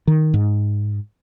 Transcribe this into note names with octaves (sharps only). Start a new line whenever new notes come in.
D#3
G#2